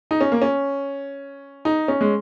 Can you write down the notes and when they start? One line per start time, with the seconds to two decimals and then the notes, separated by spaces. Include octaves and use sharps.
0.11 D#4
0.21 C#4
0.32 A#3
0.42 C#4
1.65 D#4
1.88 C#4
2.01 G#3